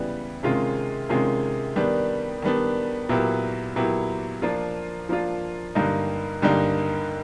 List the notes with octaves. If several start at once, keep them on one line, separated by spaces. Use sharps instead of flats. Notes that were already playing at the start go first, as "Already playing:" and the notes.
Already playing: C#3 E3 G3 B3
C3 D#3 G#3 C#4 F4
C3 D#3 G#3 C#4 F4
D#3 G3 B3 D4
D#3 G3 B3 D4
A#2 F#3 B3 E4 G4
A#2 F#3 B3 E4 G4
F3 A#3 D4 F4
F3 A#3 D4 F4
G2 D3 G3 A#3 D#4
G2 D3 G3 A#3 D#4